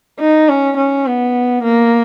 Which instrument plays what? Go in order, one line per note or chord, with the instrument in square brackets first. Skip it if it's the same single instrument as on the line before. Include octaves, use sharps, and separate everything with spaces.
[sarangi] D#4
C#4
C#4
B3
A#3